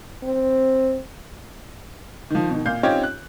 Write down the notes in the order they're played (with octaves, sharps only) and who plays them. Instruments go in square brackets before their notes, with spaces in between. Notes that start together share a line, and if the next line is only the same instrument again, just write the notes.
[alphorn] C4
[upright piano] D#3 F3
B2 D#3
A#2 F5 G6
C4 C#4 D#4 F4 G4 C#5
F#6